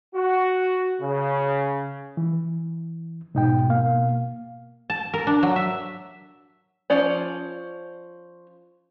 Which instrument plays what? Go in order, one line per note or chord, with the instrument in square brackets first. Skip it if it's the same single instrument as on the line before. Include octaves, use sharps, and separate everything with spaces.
[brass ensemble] F#4
C#3
[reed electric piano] E3
[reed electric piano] G#2 D#4 G5 [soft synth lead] B2
[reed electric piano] A#3 F5
[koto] A5
A#4
D4
F#3
E5
[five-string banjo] F3 C#4 D5